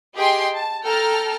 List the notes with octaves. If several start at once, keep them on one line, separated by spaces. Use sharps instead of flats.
G4 G#4 D#5 G5 G#5 C6
A5
A4 G5 A5 A#5 F6